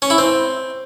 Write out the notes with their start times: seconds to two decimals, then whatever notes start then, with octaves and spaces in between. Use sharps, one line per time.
0.02 C#4
0.10 E4
0.18 C4